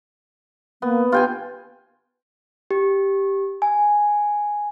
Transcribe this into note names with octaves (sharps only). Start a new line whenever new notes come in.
A#3 B3
F4 G4 G5 G#5
G4
G#5